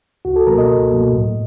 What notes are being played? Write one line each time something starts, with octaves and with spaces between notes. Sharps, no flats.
C#2 F#4
A4
B2 F#3 A#3 A#4
D#5
C#2
B2 F#3 A#3
A2